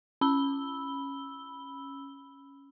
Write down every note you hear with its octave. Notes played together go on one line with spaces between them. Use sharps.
C#4 B5 E6 G7